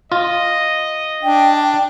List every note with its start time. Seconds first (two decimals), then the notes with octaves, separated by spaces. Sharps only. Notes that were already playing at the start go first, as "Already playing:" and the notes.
0.12 F4 D#5
1.23 D4 G5